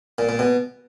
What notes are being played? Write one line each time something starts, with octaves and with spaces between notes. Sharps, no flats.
A#2
A#2
B2